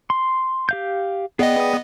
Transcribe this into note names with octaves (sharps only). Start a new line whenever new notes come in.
C6
G4 F5 G6
B3 G#4 D5 D#5 G5